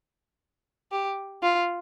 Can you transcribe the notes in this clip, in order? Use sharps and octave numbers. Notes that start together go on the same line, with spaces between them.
G4
F4